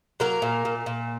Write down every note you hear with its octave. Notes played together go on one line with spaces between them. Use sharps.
F#3 A#3 A#4
A#2
A#2
A#2